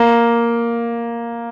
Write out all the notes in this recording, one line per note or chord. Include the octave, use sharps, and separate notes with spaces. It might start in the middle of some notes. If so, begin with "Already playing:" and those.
Already playing: A#3